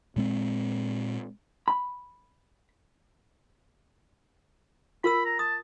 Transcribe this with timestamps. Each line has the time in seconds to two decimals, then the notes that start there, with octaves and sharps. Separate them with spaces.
0.16 A#2 G#3 C4
1.68 B5
5.04 F4 A#4 B5 E6
5.25 A#5
5.39 A5 D#6